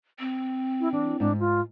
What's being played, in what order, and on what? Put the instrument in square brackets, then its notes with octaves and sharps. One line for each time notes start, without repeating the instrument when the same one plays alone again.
[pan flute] C4
[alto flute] E4
[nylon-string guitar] E3 [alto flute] D4
[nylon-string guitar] G#2 [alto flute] D4
[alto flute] F4